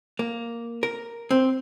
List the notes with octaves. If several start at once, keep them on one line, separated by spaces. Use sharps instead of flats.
A#3
A#4
C4